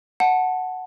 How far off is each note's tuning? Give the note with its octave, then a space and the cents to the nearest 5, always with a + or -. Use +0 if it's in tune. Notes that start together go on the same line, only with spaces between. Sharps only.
F#5 +0 A5 +0